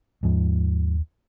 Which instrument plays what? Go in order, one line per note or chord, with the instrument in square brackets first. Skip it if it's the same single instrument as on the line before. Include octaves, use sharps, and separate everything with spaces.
[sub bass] D#2 [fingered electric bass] G#2 F3